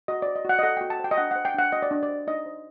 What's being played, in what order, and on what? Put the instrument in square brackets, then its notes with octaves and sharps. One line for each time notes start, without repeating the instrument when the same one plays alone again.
[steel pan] F#4 D#5
C5 D5
D#5
F#4 F#5
D#5
A4 F#5
F#4 G5
A5
C5 G5
D#5
D4 F#5
F#5
C5
G5
D4 F#5
F#4 D#5
D5
D4
D5
C5
D#4 D#5
C5